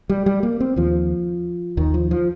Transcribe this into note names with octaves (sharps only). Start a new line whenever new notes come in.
G3
G3
A#3
C4
D#2 F3
D#2 D#3
F3
F3